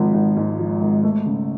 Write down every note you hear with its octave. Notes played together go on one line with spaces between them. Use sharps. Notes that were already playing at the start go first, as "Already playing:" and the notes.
Already playing: G#1 F3
G#1
G#2
F3
G#1
A3
C#3